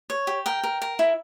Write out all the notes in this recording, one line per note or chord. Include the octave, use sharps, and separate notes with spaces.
C#5
G4
A#4 G5
A#4
A#4
E4